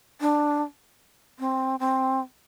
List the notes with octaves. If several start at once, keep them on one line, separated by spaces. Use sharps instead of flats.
D4
C4
C4